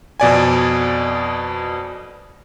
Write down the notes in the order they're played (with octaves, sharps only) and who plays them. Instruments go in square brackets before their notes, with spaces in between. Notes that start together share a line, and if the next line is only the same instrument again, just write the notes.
[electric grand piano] F2 B2 D5 G#5